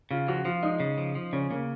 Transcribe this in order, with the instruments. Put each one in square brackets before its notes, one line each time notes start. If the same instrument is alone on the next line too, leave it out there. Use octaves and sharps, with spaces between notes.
[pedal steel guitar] C#3 [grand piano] F4
[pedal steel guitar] F3 [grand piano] F#4
[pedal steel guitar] F3 [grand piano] F4
[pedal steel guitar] G#3 [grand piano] D#4
[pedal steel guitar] C#3
F3
F3
[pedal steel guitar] C#3 [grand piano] C#4
[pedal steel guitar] C#3 [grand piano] A#3